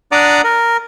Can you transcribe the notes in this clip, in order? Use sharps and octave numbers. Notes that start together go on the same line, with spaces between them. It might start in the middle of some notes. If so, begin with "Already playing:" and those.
D4 D5 F#5 A#5 D6 D#6
A#4